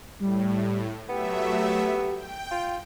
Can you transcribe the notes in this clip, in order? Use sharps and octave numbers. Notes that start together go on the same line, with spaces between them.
A2 G3
F#3 A3 B3 G4 E5
G5
F4